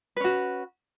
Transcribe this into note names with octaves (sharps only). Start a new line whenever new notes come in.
C#4 F#4 B4